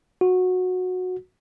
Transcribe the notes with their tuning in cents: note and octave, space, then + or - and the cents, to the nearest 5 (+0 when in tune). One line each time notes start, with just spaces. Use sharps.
F#4 -15